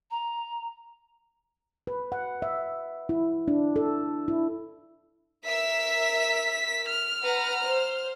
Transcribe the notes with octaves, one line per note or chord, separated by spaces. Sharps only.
A#5
B4
F#5
E5
E4
D4
A4
E4
A#4 E5 E6 B6
F6
B4 F#5 A#5
C5